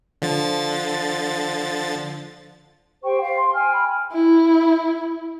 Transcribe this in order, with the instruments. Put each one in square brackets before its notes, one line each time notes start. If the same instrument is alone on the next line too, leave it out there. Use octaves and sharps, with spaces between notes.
[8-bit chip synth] D3 F3 A6
[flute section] G4 C5 G5 C#6
F5
C6
G5 G#5 F6
B5
[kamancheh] E4